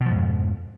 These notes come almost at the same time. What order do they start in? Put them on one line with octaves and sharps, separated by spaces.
B2 F3 G#2 F2